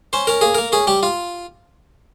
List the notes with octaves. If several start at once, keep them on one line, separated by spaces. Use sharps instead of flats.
C#4 C5
C#4 A#4
A#3 G#4
A#3 A#4
C#4 G#4
G3 G4
F4